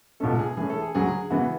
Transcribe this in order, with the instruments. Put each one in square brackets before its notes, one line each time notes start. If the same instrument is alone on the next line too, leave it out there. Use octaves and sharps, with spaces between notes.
[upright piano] C#2 B2 A3 C#4 [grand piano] A4
[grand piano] G#4
[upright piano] E3 A3 C#4 [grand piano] G#4
[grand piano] A4
G#4
[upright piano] D2 C#3 F#3 C#4 [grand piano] G#4
[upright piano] C#3 E3 B3 [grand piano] F#4